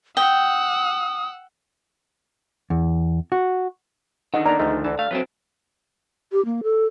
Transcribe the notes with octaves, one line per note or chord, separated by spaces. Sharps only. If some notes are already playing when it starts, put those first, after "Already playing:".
F#5 G5 D#6 E6
E2
F#4
D3 D#3 D#5 F#5
A#3 B3 D4 A#5
D2 F3 G#3 A3
D2 D3 E3 A5
A3 F5
F2 A2 F#3 C4 B4 A5
G4
A#3
A4